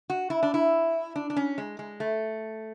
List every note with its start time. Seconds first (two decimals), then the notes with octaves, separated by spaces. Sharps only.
0.10 F#4
0.30 E4
0.43 D4
0.54 E4
1.16 D4
1.30 D4
1.36 C#4
1.58 G#3
1.79 G#3
2.00 A3